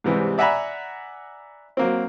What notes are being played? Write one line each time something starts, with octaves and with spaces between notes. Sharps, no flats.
G#2 C3 E3 G3
D5 E5 F#5 G#5 A#5 B5
F#3 A#3 C4